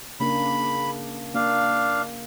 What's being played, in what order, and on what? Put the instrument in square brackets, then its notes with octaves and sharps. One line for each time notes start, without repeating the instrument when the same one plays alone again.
[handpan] C#3 A#3 D4 [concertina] B5
[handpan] A#3 [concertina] D4 F5